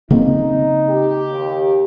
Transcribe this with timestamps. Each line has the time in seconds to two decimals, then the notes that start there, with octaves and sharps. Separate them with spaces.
0.10 C#3 A#3 C4 D#4
0.89 G4
1.30 D#2